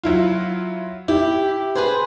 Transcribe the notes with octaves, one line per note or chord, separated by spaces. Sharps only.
F#3 E4 F4
E4 G4
G#4 B4 C5